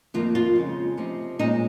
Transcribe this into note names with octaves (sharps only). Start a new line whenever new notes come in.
F2 D#3 A#3 F4
F4
F2 C#3 G#3
C3 F3 C4 D#4
A#2 G#3 C#4 D#4